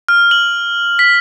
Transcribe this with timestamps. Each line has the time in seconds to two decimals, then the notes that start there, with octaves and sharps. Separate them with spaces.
0.08 F6
0.31 F#7
0.99 B6